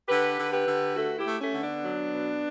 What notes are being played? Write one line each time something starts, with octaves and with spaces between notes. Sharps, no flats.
D3 G4 B4
D3
G4 B4
D3
A3 F#4 A4
E4 G4
A3
A3 C#4
D3
B3 D4
F#3
B2